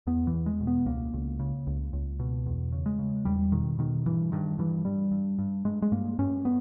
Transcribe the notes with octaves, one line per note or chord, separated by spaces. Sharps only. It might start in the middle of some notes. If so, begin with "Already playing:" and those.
E2 B3
E3
E2
G#3
B2
B3
C#2 A#3
C#2
C#3
C#2
C#2
B2
E2
C#3
G#3
C#3
E2 G3
B2 D#3
B2 D#3
G2 E3
G2 D#3
G2 E3
G2 G3
G2
G2
G2 G#3
G#3
G2 A#3
G2 C#4
B3